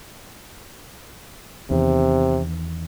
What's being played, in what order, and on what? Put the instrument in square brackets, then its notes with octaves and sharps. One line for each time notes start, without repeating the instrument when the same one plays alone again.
[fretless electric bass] E2 D#3 [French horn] C3